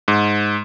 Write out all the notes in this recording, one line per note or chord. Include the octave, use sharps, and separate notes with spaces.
G#2